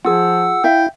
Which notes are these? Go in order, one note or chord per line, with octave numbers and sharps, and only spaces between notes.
F3 F4 G#4 F#5 E6
E4 E5 F5 G5